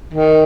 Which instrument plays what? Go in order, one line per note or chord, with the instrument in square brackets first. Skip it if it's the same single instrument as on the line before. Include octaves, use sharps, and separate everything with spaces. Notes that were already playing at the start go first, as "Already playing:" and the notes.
[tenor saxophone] D#3